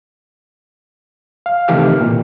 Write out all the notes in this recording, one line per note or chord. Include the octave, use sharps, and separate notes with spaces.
F5
C3 D#3 E3 A3 G4 F6
A#2